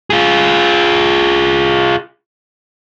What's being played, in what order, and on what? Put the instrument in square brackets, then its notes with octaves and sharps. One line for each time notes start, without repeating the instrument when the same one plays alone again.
[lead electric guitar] F4 G#4